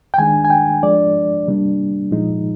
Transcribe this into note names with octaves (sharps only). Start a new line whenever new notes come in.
G5
D#3 G#3 D4 G#5
G#5
G5
F3 G#3 D4 D5
C3 G3 A#3 D4
A#2 F3 G#3 D#4